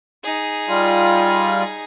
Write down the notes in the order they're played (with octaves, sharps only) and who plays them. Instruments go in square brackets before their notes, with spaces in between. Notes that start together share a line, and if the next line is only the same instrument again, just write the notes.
[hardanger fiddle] D#4 G#4
[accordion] G3 F4